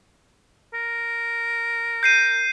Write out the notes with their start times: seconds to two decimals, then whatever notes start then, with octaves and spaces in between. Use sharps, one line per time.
0.74 A#4
2.03 G6 C7 D#7